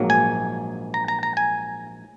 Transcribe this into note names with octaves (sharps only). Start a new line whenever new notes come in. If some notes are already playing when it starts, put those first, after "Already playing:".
Already playing: A#1 G#2 F#3 A#3
G#5
A#5
A#5
A#5
G#5